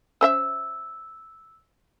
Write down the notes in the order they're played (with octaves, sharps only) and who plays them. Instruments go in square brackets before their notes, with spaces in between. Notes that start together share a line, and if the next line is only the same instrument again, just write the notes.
[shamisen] C#4 C5 E5 [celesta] E6